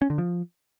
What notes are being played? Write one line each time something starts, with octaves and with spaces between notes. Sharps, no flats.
C#4
D3
F3